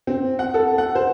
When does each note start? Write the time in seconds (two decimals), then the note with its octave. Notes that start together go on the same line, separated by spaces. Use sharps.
0.07 C4
0.39 F#5
0.54 A4
0.78 F#5
0.95 C5